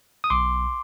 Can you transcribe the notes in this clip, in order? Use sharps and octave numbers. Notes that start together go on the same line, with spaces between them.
D#6
B1 C6 D6